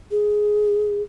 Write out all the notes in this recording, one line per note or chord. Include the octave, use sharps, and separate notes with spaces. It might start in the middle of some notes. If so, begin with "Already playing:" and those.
G#4